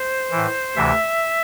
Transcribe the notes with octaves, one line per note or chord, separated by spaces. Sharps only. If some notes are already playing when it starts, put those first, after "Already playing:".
Already playing: C5
E3
A2
D2 C3 E3 E5